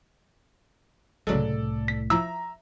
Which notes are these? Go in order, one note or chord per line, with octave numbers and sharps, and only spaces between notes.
C2 A2 C#3 F#3 G#3 A4 D5
B6
F3 E4 E5 A#5 E6